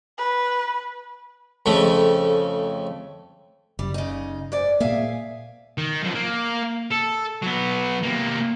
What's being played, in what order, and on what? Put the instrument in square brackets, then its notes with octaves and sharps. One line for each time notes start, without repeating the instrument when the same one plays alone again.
[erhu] B4
[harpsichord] F2 C#3 A3
[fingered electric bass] F#1 [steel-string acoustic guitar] G3
[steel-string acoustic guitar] C#3 D#4
G#2 D5
[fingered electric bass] A#2 A#3 [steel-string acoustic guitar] G#4 E5 F5
[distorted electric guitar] D#3
F#2 F3
A#3
A4
F#3 B3
C3 A#3